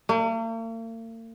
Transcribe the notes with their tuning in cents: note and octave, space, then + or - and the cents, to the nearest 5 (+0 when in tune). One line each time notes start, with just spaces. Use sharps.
A#3 -45